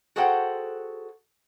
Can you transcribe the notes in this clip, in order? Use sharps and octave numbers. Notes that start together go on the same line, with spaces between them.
F#4 G#4 A4 C5 F#5 G5